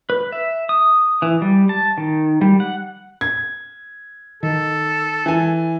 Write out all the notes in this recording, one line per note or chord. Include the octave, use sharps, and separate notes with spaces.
B4
E5
D#6
E3
G3
A5
D#3
G3
F#5
G#6
D#3 A4
E3 G#5